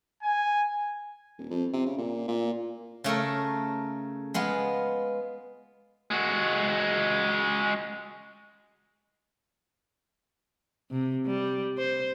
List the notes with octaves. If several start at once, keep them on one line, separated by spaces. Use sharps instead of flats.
G#5
D#1
F2
C3
C#3
A#2
A#2
C#3 A3 A4 A#4
G#3 B3 F4
G#3 F#4
C3
G3
C5